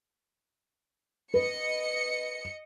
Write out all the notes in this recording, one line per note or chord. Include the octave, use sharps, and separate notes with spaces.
B4 D#5 C#7